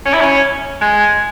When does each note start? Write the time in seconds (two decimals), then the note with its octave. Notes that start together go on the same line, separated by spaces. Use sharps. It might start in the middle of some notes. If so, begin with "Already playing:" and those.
0.05 C#4
0.13 E4
0.21 C#4
0.81 G#3